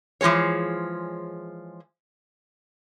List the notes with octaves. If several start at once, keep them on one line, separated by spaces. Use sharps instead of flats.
E3 F3 G#3 G#4 C#5